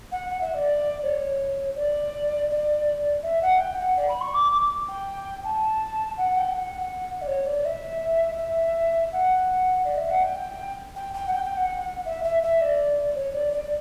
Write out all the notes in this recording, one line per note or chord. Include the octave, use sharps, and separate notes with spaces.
F#5
F#5
E5
D5
C#5
D5
D5
E5
F#5
G5
F#5
D5
B5
C#6
D6
D6
G5
A5
F#5
G5
F#5
D5
C#5
D5
E5
E5
F#5
D5
E5
F#5
G5
G5
G5
F#5
G5
G5
F#5
E5
E5
E5
D5
C#5
D5
D5